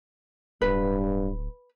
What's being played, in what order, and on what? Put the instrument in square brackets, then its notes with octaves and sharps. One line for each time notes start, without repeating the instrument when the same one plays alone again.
[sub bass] D1 [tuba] G2 [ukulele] B4